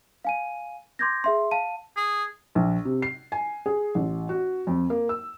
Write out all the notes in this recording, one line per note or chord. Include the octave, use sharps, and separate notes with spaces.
F5 G#5 D#7
C6 D6 G6 G#6 A#6
G#4 E5 C6
F5 A5 D#7
G#4
A#1
C3
C7
G#5
G#4
A1
F#4
F2
A#3
E6